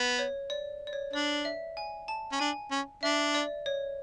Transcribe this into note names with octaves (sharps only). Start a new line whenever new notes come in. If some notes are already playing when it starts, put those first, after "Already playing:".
Already playing: B3
C#5
D5
D5
C#5
D4 D5
E5
G#5
A5
C#4
D4 G#5
C#4
D4 E5
D5
C#5